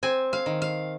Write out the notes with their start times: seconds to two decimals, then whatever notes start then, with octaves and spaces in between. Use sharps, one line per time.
0.03 C4 G#5
0.33 F5
0.46 D#3
0.62 F5